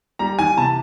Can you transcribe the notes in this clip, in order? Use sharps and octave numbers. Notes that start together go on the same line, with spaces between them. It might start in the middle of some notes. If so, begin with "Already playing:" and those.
G3 A#5
E3 G#5
C3 A5